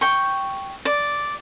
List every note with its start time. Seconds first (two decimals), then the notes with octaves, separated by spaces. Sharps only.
0.01 G5 C#6
0.85 D5